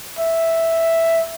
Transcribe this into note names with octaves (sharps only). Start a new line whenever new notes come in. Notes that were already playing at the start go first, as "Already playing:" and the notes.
E5